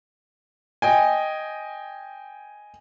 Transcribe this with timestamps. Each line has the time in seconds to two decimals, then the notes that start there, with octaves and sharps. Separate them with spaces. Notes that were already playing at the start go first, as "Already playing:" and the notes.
0.82 D#5 G5 G#5